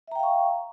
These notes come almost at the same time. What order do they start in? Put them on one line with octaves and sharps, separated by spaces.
E5 A#5 G5 F5 C#6